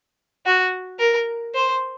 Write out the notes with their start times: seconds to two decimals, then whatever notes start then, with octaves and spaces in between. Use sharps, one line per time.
0.46 F#4
0.99 A#4
1.55 C5